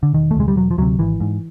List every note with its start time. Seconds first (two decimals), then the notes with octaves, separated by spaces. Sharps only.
0.03 D3
0.13 E1 D#3
0.31 A3
0.36 D2 C3 G#3
0.48 G3
0.56 E1 F#3
0.71 F3
0.78 D2 C3 F#3
0.99 G#1 E3
1.20 G#2